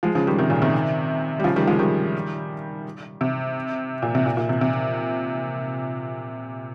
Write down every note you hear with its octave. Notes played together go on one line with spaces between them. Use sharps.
F3 G#3
C#3 F3
D#3 G3
C3 D#3
A#2 C#3
C3 D#3
G3
C#3 F3
D#3 G3
F3 G#3
D#3 G3
C3
A#2
C3
A#2
A#2
C3
C3